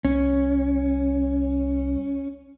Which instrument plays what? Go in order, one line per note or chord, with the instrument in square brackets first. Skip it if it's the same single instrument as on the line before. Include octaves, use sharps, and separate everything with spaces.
[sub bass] C2 [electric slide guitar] C#4